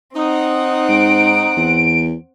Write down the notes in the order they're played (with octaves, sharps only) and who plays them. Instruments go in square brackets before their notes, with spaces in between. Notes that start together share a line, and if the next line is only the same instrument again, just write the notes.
[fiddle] C4 F#5 [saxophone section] D#4
[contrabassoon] G#2 [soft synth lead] D7
[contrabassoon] E2